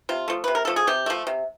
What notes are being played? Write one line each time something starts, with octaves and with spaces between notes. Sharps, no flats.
C3 F4
F3 A3
C3 B4
A#4
F3 A3 A4
G#4
C3 G4
F3 A3
C3